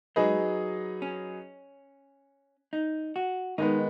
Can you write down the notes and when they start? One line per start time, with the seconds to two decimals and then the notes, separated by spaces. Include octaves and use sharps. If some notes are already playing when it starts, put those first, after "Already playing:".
0.16 F#3 G#3 D#4 G#4 B4 D#5
1.02 C#4
2.73 D#4
3.16 F#4
3.58 D#3 G#3 B3 D#4